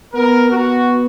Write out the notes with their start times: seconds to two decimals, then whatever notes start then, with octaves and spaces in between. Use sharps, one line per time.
0.14 B3 A#4
0.50 B3 F#4